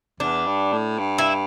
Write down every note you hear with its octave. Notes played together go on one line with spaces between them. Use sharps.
E2 D4
G2
A2
G2
E4